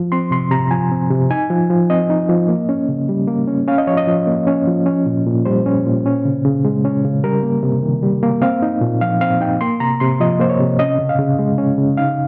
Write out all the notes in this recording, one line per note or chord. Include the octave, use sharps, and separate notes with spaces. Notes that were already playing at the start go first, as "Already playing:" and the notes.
Already playing: F3
C4 C6
C3 C6
C3 A#5
F3 G#5
C4
C3
D#4 G#5
F3
F3
C4 D#5
D#4
F3
A#3
C#4
C#3
G3
A#3
C#4
C#4 F5
D#5
F3 C#5
D#5
F3
A#3
C#4
F3
C#4
A#2
A#2
G3 C5
C#4
A#2
C#4
C#3
C#3
G#3
C#4
C#3
G3 A#4
A#3
C3
D#3
G3
A#3
C4 F5
D#4
A#2
F3 F5
C4 F5
D#4 G5
A#3 C6
C3 A#5
C3 C6
F3 D#5
A#3 C5
C#5
C3
C#4 D#5
C#3
F5
C#3
G#3
C#4
C#3
D#4 F5